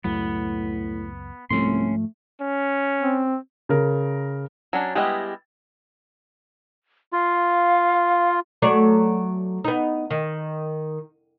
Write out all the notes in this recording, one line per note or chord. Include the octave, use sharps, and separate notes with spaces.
C#2 F#2 A2 F#3 B3
C2 G#2 F3 A3 C#4 C6
C#4
C4
C#3 A#4
F#3 C#4 D4
G3 G#3 B3 E4 G4 D#5
F4 F5
F#3 A3 D5
B3 D#4
D#3